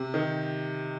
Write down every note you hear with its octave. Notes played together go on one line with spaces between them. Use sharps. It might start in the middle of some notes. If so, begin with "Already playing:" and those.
Already playing: C3
D#3